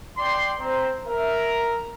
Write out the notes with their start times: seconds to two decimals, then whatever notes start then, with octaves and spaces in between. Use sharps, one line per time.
0.18 D5 G5 C6
0.60 C4 C5 A#5
1.07 A#4 E5